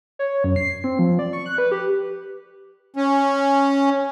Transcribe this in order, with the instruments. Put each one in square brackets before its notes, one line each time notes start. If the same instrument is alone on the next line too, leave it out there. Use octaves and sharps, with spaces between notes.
[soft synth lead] C#5
F#2
C7
C4
F3
D5
C#6
F#6
B4
G4
[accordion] C#4